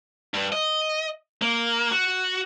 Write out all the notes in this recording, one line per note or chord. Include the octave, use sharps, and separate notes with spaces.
G2
D#5
A#3
F#4